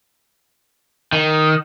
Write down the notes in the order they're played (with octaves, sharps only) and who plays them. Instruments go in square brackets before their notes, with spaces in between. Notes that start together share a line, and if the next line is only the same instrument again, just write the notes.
[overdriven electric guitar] D#3